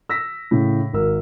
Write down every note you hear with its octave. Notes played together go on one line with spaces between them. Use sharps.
E6 A#6 B6
A2 C#3
G#1 A#4 E6